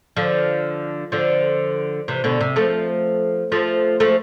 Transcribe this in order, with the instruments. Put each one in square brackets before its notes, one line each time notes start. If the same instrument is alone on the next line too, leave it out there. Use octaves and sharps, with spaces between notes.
[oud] D3 F3
D3 F3
C3 E3
B2 D3
C3
F3 A3
F3 A3
F3 A3